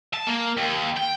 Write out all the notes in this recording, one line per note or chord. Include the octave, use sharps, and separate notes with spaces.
A5
A#3
D#2
G5